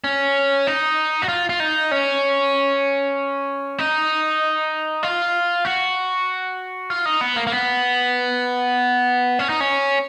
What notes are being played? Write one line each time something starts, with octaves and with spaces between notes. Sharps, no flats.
C#4
D#4
F#4
F4
F4
D#4
C#4
D#4
F4
F#4
F4
D#4
B3
A#3
A#3
B3
C#4
D#4
C#4